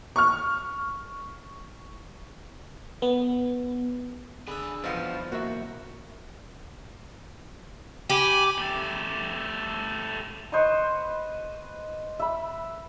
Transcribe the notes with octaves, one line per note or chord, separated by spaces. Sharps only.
C#6 F6
B3
D3 G#4 G#5 B5 E6
B1 E2 B2 F3 B3 C5 F6 A6
A#3 F#4 E5
G4 G#5 B5 D6
A3 G4
B4 C5 D#5 C#6
E5 B5